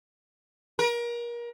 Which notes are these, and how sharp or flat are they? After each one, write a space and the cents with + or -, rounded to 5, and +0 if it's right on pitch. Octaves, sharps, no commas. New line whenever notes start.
A#4 +30